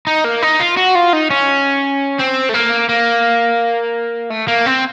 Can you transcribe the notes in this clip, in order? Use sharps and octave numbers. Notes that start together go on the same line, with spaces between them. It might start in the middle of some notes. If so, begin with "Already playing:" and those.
D#4
A#3
D#4
F4
F#4
F4
D#4
C#4
C4
A3
A#3
A#3
A3
A#3
C4